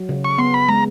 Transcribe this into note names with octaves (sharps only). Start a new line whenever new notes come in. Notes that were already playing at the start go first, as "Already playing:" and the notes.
Already playing: F#3
C#3
C#6
B3 C6
B5
G#3 A#5